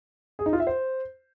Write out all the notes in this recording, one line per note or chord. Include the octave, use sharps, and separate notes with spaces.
G#4
D#4
F4
E5
C5